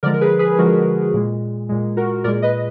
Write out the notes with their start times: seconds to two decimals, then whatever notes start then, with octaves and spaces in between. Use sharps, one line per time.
0.03 D3 F3 G#3 A#4 D5
0.14 A#4
0.21 G#4 B4
0.39 G#4 B4
0.58 D3 F3 G#3 F#4 A#4
1.14 A#2 G#3
1.69 A#2 G#3
1.97 F#4 A#4
2.24 A#2 G#3 A#4 D5
2.42 B4 D#5